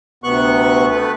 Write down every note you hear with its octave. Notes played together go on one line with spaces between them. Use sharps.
D2 C3 B3 C#6 F#6
A3 B4